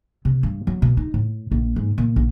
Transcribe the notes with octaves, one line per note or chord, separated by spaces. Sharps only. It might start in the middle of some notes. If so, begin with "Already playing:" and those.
C3
G2
F#3
B2
D#4
A2
A#1
G#2
A#2
A#1